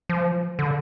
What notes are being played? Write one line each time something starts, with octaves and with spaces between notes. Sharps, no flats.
F3
D3